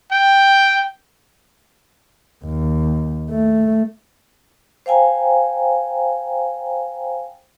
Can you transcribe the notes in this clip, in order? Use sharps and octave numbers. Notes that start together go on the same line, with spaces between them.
G5
D#2
A3
C5 F5 G5 G#5 A#5